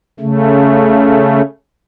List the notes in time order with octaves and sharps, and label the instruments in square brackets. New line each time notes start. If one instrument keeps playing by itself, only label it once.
[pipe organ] C#3 A3